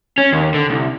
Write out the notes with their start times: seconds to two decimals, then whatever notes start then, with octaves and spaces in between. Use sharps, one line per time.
0.18 C#4
0.33 D#2
0.55 D3
0.70 C2